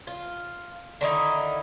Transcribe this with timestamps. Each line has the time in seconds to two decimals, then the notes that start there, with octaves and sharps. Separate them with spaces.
0.07 F4
1.01 D3 D#3 D#4 E4